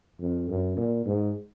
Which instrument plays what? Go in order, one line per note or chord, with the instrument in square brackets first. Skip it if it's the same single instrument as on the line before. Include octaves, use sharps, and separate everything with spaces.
[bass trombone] F2
F#2
A#2
G#2